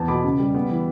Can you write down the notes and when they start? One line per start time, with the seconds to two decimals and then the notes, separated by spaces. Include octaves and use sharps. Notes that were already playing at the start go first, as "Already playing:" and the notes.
Already playing: E2 A5
0.08 B2 B5 D6
0.24 C#3
0.39 G3
0.55 B3
0.70 E3